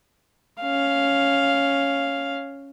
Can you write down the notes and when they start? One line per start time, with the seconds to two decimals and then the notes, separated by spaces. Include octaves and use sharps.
0.60 C#4 F5